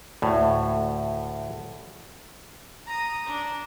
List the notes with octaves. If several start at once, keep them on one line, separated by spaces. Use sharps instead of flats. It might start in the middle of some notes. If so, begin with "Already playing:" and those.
D2 A2
A#5 D#6
D4